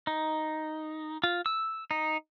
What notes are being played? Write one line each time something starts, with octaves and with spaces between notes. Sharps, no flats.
D#4
F4
E6
D#4